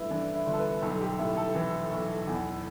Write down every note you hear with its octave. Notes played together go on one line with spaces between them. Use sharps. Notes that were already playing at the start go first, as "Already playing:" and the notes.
Already playing: G2 A3 E4 B4
E3 D4
E4
G1
A4
B4
B1 A4
G4
A2 E4
A4
E3
B1
E2